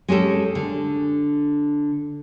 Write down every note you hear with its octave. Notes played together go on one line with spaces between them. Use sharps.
G#3 C#4 G4 A4
D3